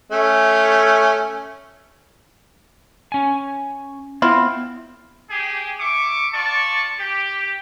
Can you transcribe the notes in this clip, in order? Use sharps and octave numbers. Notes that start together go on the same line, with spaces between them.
A3 C#4
C#4 G#5
B3 C4 E4 F4
G4 G#4
E5 C#6 D6
F4 D5 A5 C#6
G4